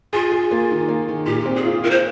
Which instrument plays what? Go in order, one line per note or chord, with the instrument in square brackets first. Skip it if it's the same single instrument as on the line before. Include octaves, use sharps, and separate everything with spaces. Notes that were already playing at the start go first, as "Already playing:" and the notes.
[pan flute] F4 [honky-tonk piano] G#4
[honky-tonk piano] G#4
A#3
D#3
A#3
D#3
[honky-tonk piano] A#2 [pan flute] G4
[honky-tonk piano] C4
[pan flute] G#4
[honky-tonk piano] F4
[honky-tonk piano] F4 [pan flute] A#4
[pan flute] C5